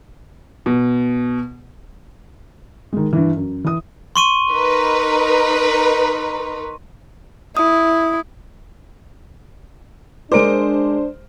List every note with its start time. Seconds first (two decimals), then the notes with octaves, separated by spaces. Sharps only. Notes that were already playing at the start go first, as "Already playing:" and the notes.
0.66 B2
2.93 D#3 G#3
3.13 G2 E3
3.37 F#2
3.64 E3 D#6
4.16 C6 C#6 D#7
4.51 D#4 A#4 B4
7.57 E4 D#6
10.32 G#3 D4 A#4 C5 D6 D7